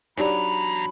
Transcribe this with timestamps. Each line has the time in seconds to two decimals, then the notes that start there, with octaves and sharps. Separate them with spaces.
0.17 E2 F#3 D4 D#4 G4 D5 A#5 B5